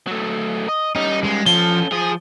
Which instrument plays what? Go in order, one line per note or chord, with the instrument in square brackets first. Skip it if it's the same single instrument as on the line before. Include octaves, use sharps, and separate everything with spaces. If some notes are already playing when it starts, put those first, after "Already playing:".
[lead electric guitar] F#3 A3
D#5
[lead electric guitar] G3 C#4 [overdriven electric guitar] D#4
[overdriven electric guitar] G#3
[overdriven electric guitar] F3 [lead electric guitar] C#4 A4 [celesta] G7
[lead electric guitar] F3 [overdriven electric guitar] G#4